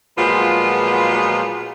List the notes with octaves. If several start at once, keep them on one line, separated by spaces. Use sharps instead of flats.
A#2 F3 F#3 G#3 B3 F4